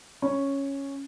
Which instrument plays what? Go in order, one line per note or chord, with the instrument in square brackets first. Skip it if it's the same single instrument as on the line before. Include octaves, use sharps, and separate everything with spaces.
[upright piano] C#4